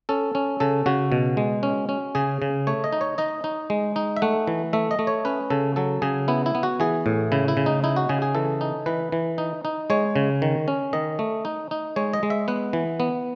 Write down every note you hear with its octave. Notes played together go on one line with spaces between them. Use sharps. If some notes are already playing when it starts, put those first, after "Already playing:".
C#4 A4
C#4
C#3 A4
C#3 F#4
B2
G#3
C#4
C#4
C#3 G#4
C#3
A3 C#5
D#5
D#4
C#5
D#4 D#5
D#4
G#3
D#4
E5
A3 F#5
E3
A3 E5
D#5
A3
C#5
C#4 B4
C#3 A4
F#3 A4
C#3 G#4
B3 E4
E4
B3
F#4
E3 G#4
A2
C#3 E4
E4
C#3
D#4
D#4 E4
F#4
C#3 G#4
G#4
E3 A4
D#4
E3 B4
E3
D#4
D#4
G#3 C#5
C#3
D#3
C#4
D#3 D#5
A3
D#4
D#4
G#3 C#5
D#5
G#3
E5
B3 F#5
E3
B3